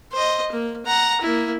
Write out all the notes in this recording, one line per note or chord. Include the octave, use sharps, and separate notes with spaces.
C5 D#5
A#3
F#5 A#5
A#3 E4